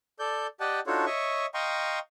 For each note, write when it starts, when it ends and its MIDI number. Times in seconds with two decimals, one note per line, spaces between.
0.19 0.47 69
0.19 0.47 74
0.19 0.47 91
0.60 0.80 67
0.60 0.80 74
0.60 0.80 75
0.60 0.80 78
0.60 0.80 79
0.60 0.80 81
0.87 1.05 62
0.87 1.05 63
0.87 1.05 65
0.87 1.05 66
0.87 1.05 69
0.87 1.05 73
1.06 1.46 73
1.06 1.46 75
1.06 1.46 76
1.06 1.46 85
1.54 1.99 75
1.54 1.99 77
1.54 1.99 79
1.54 1.99 82
1.54 1.99 84
1.54 1.99 85